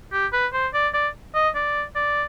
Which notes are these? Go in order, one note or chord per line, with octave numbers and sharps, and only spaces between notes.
G4
B4
C5
D5
D5
D#5
D5
D5